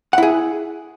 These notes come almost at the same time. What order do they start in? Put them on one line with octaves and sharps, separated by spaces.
F#5 E4 G#4